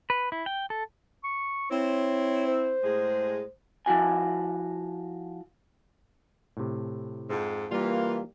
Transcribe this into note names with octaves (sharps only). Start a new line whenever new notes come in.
B4
E4
G5
A4
C#6
C4 E4 C#5
C5
A2 G#3 G#4
F3 E4 F#4 G#5
A2 C3
F2 G#2
E3 G3 A#3 F4